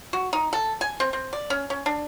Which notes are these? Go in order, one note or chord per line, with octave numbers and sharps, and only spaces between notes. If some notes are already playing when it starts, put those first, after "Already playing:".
F#4
D#4
A4
G#5
C4
C4
D5
C#4
C#4
D4